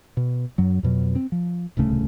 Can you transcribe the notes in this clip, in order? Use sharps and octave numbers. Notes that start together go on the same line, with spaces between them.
B2
F#2 F#3
F2 B2 F#3
C4
F3
D1 C2 C#3 A3